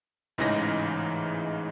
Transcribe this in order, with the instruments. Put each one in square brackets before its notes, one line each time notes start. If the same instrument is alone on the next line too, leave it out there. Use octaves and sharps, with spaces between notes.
[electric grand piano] A1 G#2 C#3 E3 D#4 A#6